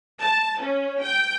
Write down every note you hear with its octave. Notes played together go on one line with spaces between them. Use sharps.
A5
C#4
G5